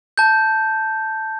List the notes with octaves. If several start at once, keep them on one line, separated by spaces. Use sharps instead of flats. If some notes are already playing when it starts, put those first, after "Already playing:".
A5 G6